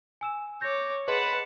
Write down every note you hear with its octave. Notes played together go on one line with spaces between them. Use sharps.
G#5 E6 E7
C#5 D6 G6 A#6
G#4 B4 D#5 F#5 A5 C6